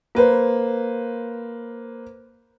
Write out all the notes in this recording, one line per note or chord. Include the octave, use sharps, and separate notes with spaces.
A#3 B4 C5